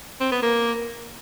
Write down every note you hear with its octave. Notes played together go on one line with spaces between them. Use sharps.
C4
B3
A#3